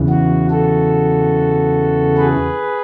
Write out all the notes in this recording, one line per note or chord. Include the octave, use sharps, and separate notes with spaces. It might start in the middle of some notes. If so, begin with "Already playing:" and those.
Already playing: E2 C#3 E3
F#4
F#4 A4
G#4 B4